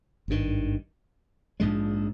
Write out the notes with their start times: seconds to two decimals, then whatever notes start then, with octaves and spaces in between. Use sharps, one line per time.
0.28 G#1 G2 D#3
1.60 A#1 G#2 F3 G#3